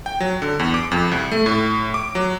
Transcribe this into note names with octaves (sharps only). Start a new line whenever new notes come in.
G5
F#3
D3
E2
D6
F2
C2
A3
A2
D6
F#3